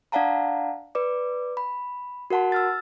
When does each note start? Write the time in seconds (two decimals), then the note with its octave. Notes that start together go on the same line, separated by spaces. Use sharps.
0.12 D4 D5 F5 F#5 A5 A#5
0.95 B4 D5 D6
1.57 B5
2.30 F#4 A#4 F#5 A5 C6
2.52 E6 F6 A6